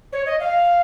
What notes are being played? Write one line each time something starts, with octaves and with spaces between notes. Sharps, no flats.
C#5
D#5
F5